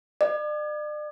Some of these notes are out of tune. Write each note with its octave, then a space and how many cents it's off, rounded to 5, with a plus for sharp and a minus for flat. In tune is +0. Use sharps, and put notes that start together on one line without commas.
D5 +40